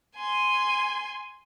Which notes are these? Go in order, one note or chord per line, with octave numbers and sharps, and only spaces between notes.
G#5 C6